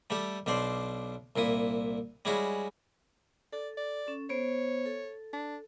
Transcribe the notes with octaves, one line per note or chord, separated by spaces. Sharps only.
G3 A3 G4 A4
B1 B2 D4 C5 D5 C6
C2 A#2 E4 D#6
G3 G#3 C#4 E4 F#4 G#4
A4 D5
D5
C#4 A4
B3 C5 C#5
A4
D4